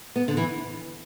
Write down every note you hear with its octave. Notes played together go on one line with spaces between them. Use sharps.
B3
D3
E3